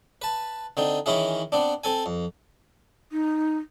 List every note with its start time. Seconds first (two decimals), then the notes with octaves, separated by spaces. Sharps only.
0.22 B4 A5
0.77 D3 C4 D#4
1.06 D#3 E3 C#4 E4 G#4
1.52 B3 C4 D4
1.84 C4 A4 G#5
2.06 F2
3.12 D#4